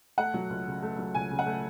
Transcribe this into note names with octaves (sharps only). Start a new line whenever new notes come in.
A3 F#5
F#3
C#2
C#3
A3
F#3
C#2 G#5
C#3
F#5
A3